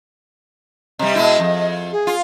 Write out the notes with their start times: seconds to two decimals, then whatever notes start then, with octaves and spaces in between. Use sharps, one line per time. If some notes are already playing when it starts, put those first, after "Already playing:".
0.99 C3 G3 D#5
1.15 B2 G#3 E4
1.39 F2
1.92 G#4
2.07 F4